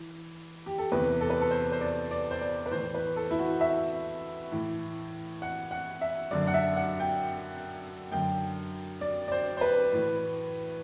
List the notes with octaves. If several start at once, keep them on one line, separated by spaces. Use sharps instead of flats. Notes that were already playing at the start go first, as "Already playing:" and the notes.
Already playing: E3
G4
A4
E2 C3 E3 B4
A4
B4
A4
C5
C5
D5
D5
C5
D5
B4
A2 E3 C5
B4
A4
E4
F#4
E5
A2 E3
F#5
F#5
E5
F#2 D3 D5
F#5
E5
F#5
G5
F#2 D3 G5
D5
D5
C5
C5
B4
A2 E3